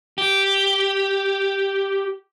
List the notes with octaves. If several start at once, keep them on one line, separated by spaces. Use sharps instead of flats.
G4